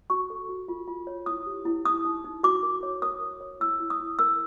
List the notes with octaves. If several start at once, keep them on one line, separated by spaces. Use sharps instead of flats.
F#4 C#6
A4
F#4
F4
F4
C#5
E4 D#6
G4
E4
D#4 D#6
D#4
D#4
F#4 D6
A#4
C#5
A#4 D#6
A#4
C#5
E4 E6
E4
D#6
E4
A#4 E6